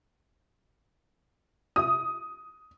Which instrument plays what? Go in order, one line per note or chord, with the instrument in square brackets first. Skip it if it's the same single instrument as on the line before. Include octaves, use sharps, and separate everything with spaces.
[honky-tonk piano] D#6